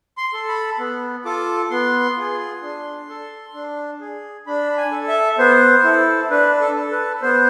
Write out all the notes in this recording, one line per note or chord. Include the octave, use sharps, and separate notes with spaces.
C6
A4
B5
B3
F4 A4 D6
B3 C6
F4 G#4
D4
A4
D4
G#4
D4 B5
G#5
A4
E5
B3 C5
E4 A4
D4 B4
A4
A4
B4
B3 C5